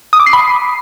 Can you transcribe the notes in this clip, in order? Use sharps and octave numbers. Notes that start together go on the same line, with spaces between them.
D#6
D6
C7
B5